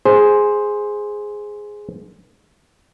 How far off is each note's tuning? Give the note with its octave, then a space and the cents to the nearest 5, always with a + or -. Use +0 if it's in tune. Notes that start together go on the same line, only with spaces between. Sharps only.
G#4 +0 C5 +0